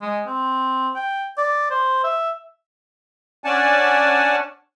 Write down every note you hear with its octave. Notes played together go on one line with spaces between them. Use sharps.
G#3
C4
G5
D5
C5
E5
C#4 D4 D5 F#5 G#5 A5